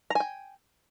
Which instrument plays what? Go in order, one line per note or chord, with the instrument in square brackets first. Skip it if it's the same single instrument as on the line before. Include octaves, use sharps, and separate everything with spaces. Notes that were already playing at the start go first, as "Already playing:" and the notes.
[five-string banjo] A#5
G#5
G5